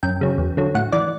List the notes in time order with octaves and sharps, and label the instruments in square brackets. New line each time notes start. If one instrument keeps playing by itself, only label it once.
[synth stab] F#2 G5
C#3 F#3
E2
D3 F#3
A2 F#5
E3 D5